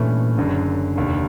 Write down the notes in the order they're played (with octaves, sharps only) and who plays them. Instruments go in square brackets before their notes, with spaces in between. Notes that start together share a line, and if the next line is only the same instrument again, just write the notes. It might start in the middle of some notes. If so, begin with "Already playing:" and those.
Already playing: [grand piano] G2 E3 A3 C#4 [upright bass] A#2
[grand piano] F#1 F#2 D3
F1 D#2 D3